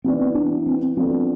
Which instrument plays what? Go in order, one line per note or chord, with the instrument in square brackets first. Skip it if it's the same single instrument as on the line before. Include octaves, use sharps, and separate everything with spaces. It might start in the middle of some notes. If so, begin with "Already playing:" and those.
[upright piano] E3 B3 E4 B4 D5 [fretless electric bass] C4
[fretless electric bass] D4
C4
[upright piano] F3 B3 D4 A4 [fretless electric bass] C4